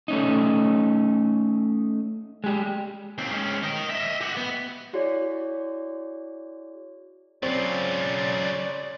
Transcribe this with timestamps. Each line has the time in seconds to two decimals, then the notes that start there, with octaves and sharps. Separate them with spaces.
0.08 A3 C#4 D#4
2.44 G#3 G4
3.18 D#2 C4
3.31 G#2 C#4
3.63 D#4 A#4
3.90 D#5 E5
4.21 G4 F#5
4.37 B3
4.93 E4 F#4 G#4 C#5 D5
7.43 C#3 F#3 C4 F4 D5